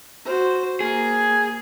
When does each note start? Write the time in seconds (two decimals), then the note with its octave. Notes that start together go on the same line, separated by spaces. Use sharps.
0.25 F#4 C5
0.80 A#3 G#4